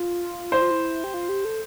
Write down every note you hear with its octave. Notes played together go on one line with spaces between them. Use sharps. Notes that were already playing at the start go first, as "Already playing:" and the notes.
Already playing: F4
E4 C5
F4
E4
G4
F4
G4
A4